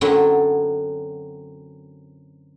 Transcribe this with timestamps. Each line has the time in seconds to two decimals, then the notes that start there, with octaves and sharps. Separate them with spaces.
0.01 F#2 D3 F#3 A3 C4 E4